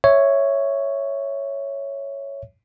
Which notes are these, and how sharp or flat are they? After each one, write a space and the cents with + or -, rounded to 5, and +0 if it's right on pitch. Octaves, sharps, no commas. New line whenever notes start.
C#5 +0 E5 +0